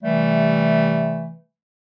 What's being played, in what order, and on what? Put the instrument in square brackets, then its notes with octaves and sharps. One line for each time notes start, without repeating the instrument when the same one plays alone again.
[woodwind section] C3 E3 G3 A3